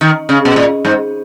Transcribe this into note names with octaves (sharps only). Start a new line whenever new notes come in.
D#3
C#3
B2
A#2
G#2